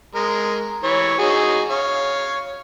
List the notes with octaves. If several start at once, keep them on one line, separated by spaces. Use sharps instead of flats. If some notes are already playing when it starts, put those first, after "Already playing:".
G#3 A#4
E3 C#5
D#4 F#4 G#4
C#5 F5